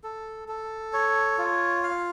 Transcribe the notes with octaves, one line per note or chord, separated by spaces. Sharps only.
A4
A4
C#5
F4
F5